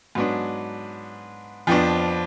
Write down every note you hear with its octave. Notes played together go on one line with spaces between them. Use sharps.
G#2 F#3 B3 D4
F2 F3 B3 D4